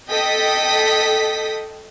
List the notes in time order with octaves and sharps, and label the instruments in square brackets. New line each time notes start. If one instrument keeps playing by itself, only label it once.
[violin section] A4 D#5 G5 D#6 B6